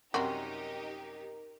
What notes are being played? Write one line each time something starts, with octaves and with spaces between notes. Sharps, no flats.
F#2 C3 G3 D#4 F#4 G4 A#4 C6